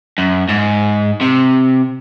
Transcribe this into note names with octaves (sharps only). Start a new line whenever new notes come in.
F#2
G#2
C3